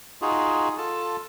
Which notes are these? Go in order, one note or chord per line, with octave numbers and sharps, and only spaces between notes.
D#4 F4 F#4 G#4
F4 A4 A5